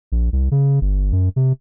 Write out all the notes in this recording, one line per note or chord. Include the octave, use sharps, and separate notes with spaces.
A#1
C2
C#3
G1
F#2
C3